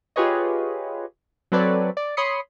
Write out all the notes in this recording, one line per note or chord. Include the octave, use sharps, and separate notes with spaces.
F4 G4 G#4 B4 C#5 D#5
F#3 C4 A4 B4 C#5 D5
D5
C#5 B5 C6 D#6 C7 C#7